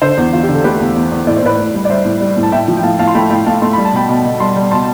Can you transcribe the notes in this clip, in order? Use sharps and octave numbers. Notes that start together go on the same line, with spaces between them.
D3 A4 C5
E2
E2 F4
G4
D3
A4
A3 G4 B4
E2
E2
E2
A2 D5
C5
A2 B4 D5
A2
G3
D5
G3 C5 E5
A2
G3
A2
A5
A2 E5 G5
F3
G5
A2 F5 A5
A2 F5 A5
C6
A3 G5 B5
A2 G5 B5
A3 F5 A5
A3 C6
G3 B5
A5
B2 G5 B5
B2
B2
G3 A5 C6
G3
B2 A5 C6